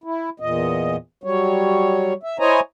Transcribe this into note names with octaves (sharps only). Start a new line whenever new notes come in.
E4
E2 A#2 D#5
F#3 G3 C#5
E5
E4 C5 C#5 D#5 G#5 A#5